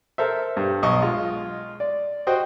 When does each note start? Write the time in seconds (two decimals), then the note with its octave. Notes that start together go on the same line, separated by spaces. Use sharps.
0.18 A4 A#4 C5 E5
0.57 G2
0.83 B1 D#5 C#6
1.02 G#3 F4
1.80 D5
2.27 F#4 C5 D#5 G5